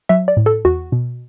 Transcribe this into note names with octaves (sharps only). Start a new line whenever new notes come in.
F#3 E5
D5
A2
A4
E2 F#4
B2